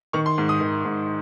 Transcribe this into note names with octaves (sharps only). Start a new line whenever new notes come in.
D#3 C#6
C6
G#2
D#6
D#3
G#2